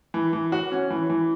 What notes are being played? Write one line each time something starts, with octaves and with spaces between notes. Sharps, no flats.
E3
E3
F#4
C#4
E3
E3